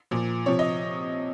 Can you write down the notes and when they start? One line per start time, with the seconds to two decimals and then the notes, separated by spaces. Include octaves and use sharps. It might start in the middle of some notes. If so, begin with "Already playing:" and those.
0.11 A#2 F3
0.46 C3 F3 C#5
0.59 D#5